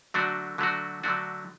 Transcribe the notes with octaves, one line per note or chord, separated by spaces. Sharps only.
D3 F#3 A3 D4 F#4
D3 F#3 A3 D4 F#4
D3 F#3 A3 D4 F#4